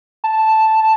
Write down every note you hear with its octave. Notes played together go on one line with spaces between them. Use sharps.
A5